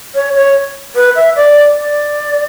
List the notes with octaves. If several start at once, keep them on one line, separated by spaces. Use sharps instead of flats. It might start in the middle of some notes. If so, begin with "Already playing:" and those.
C#5
C#5
B4
E5
D5
D5